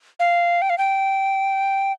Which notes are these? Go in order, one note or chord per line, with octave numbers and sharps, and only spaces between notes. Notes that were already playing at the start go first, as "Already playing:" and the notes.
F5
G5
F5
G5